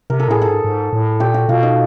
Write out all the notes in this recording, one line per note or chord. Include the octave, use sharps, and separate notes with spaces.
C3 A#4
A4
A2 G#4
A4
G#2
G#2
A2
A#2 G4
F#4
B2 F4
D#4